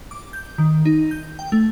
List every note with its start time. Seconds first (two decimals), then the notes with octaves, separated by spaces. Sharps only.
0.11 D6
0.33 G6
0.58 D#3
0.85 D#4
1.11 G6
1.39 G5
1.52 A3